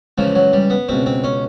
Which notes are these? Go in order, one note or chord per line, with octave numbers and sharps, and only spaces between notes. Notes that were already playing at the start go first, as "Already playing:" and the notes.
C#2 C#3 E3 F3
F#3
G3
B3
C#2 B2 C4
C4
C#4